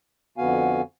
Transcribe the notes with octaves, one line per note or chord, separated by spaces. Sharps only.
F2 D3 B3 F#4 F5 G#5